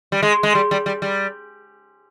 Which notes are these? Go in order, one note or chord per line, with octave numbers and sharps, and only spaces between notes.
G3
G#3
G#3
G3
G3
G3
G3